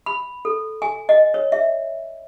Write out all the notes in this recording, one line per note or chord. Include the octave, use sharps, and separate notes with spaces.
B5
A4
G#5
D#5
C#5
E5